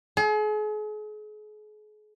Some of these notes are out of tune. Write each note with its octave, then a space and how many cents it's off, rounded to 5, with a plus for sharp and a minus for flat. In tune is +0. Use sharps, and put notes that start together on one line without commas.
G#4 +40